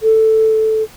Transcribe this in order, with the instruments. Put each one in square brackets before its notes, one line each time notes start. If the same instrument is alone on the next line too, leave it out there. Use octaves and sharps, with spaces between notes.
[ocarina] A4